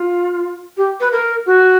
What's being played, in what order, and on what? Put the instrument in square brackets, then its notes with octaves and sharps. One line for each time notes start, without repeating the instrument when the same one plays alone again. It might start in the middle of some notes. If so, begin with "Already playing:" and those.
Already playing: [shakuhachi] F4
G4
B4
A#4
F#4